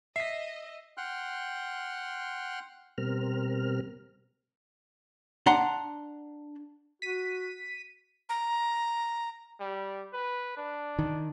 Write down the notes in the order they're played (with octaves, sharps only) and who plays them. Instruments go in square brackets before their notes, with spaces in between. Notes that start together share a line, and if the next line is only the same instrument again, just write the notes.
[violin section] D#5 [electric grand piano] E5 B6 [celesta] C7
[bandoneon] F#5 G5 C6 F6 F#6
[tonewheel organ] B2 G3 C4 A#4 F6
[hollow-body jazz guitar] D4 F#5 A#5 C6
[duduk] F#4 [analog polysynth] B6 D#7
[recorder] A#5
[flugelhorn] G3
B4
D4
[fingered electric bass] D#3